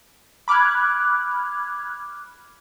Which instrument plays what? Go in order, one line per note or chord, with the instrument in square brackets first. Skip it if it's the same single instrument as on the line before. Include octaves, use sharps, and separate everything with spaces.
[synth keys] B5 D6 F6 F#6 G#6